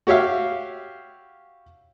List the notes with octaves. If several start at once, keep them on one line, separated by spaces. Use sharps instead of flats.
F#4 G4 C#5 E5 F5